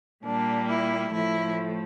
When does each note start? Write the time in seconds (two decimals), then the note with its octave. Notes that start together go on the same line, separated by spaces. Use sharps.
0.25 A#2 G3 A#3 D4
0.69 E4
1.12 A2 F3 A3 E4